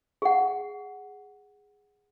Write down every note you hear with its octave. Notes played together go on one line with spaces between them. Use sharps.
G#4 F#5